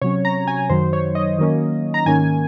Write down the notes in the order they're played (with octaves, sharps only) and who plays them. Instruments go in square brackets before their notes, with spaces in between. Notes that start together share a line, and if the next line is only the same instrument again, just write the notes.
[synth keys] C3 F#3 C#4 C#5
A#5
G#5
F#2 D#3 F#3 C5
C#5
D#5
D#3 F#3 A#3 C#4
A#5
G#2 D#3 A#3 C#4 G#5